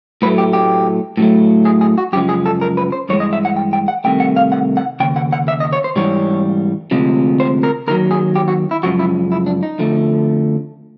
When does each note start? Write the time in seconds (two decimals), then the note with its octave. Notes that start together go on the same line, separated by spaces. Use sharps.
0.22 A2 F#3 A3 B4
0.38 G4
0.53 G4
1.17 A2 F#3 A3
1.65 G#4
1.81 G#4
1.98 F#4
2.13 F#2 C#3 F3 G#3 G4
2.29 G#4
2.46 A4
2.61 A#4
2.77 B4
2.92 C5
3.09 G2 E3 C#5
3.13 G#3
3.20 D#5
3.33 E5
3.45 F#5
3.56 G5
3.73 G5
3.88 F#5
4.04 C2 C3 D#3 A3 G5
4.20 F#5
4.36 F5
4.52 F#5
4.77 F#5
5.00 D#2 C#3 G5
5.16 F#5
5.33 F#5
5.48 E5
5.60 D#5
5.73 C#5
5.84 C5
5.96 G#2 E3 G3 C#5
6.91 D2 C3 F3 G#3
7.40 C5
7.63 A#4
7.87 D#2 D#3 F#3 A#4
8.11 G#4
8.35 G4
8.48 F#4
8.71 E4
8.83 F#2 C#3 F3 G#3 F#4
8.99 E4
9.32 E4
9.46 D4
9.63 D#4
9.79 F2 D3 F3 A3